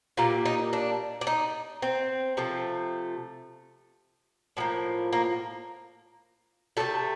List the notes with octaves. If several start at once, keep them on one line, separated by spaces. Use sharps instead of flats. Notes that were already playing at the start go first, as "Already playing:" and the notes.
A#2 G3 A#3 F4
D#4
D4
D4
D#4
C4
C3 F3 A3
A2 F3 A#3
A#3
C3 D#3 A3 A4